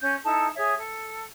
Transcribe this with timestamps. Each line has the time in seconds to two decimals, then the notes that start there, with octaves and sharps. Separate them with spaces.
0.01 C#4 G6
0.25 D#4 E4 A4 A5
0.56 G#4 C#5 E5
0.78 A4